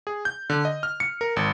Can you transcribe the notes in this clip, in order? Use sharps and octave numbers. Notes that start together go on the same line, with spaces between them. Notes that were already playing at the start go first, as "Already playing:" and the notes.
G#4
G6
D3
D#5
F6
C#7
A#4
G#1